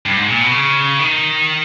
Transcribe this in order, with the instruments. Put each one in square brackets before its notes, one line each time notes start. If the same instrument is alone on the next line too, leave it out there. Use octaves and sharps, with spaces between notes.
[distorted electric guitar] G2
G#2
A#2
B2
C#3
D#3